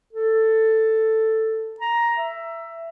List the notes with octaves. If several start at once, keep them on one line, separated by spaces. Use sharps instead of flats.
A4
A#5
E5